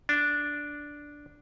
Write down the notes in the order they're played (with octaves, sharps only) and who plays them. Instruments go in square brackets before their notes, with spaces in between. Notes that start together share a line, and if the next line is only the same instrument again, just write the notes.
[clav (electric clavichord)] D4